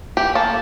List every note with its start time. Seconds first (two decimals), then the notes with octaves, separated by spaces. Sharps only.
0.17 E3 G4
0.35 A#3 A4